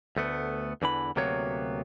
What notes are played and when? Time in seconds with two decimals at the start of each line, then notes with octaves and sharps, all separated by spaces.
0.16 D2 A3 B3
0.82 E2 D3 E3 B5
1.16 D2 C3 F#3 A#3 B3 C#5